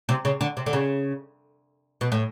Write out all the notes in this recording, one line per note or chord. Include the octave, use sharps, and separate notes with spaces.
C3
C#3
D3
C3
D3
C#3
B2
A2